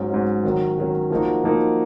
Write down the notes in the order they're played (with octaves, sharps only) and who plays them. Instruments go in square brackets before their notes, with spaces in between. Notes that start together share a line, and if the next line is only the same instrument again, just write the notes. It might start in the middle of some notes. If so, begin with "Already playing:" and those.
Already playing: [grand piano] G#2 F#3 C#4
G#2 F#3 C#4
D#3 F#3 C#4
D#3 F#3 C#4
F3 A#3 D#4 F#4
F3 A#3 D#4 F#4